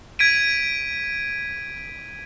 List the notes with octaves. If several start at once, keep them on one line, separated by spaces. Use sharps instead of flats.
G#6 B6 D7 D#7